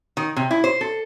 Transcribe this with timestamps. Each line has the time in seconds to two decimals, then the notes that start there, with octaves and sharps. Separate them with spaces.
0.17 D#3
0.36 C3
0.51 E4
0.64 C5
0.81 A4